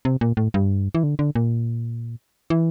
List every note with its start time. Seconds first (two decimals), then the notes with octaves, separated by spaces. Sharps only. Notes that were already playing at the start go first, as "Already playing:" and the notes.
0.05 C3
0.21 A#2
0.37 A2
0.54 G2
0.95 E3
1.03 D3
1.19 D3
1.35 A#2
2.50 E3